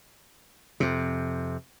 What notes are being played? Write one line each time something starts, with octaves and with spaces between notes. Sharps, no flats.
F2 C3